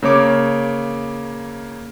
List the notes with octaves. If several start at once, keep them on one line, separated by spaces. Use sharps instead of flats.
C#3 A#3 C#5 D6